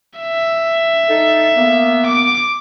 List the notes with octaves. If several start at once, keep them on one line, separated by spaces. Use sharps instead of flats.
E5
D#4 A4
A#3 B3
D6